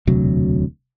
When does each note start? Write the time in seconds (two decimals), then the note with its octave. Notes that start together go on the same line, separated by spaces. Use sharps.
0.07 E1 D2 C3 F#3